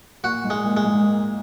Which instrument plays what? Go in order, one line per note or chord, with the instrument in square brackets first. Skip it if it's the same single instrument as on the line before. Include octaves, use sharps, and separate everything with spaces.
[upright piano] A#2 [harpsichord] F#4
[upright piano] G#2
[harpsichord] G#3
[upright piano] A#2
[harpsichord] G#3
[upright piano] G#2